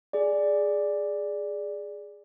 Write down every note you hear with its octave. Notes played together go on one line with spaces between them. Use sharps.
G#4 D5